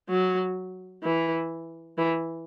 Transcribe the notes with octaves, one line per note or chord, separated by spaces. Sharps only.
F#3
E3
E3